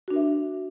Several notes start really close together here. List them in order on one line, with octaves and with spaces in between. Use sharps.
F#4 D4 A#4 E5